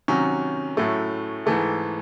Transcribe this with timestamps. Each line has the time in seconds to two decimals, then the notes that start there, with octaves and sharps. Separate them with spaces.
0.08 C3 D#3 F#3 C#4
0.77 A2 F#3 A3
1.46 G#2 E3 A3 A4